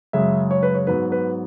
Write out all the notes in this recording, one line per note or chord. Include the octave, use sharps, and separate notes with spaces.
F#2 C#3 G#3 E5
C#5
B4
C#5
G#2 F#3 B3 B4
B4